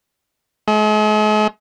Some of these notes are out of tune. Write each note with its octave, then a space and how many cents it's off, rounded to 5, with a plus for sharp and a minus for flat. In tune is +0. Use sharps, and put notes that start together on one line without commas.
G#3 +45